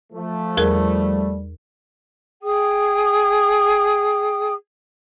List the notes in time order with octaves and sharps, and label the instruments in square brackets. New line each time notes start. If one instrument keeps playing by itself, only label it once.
[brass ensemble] F3 A3
[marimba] E2 G#4 A#4 [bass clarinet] G3
[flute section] G#4 G5 D#6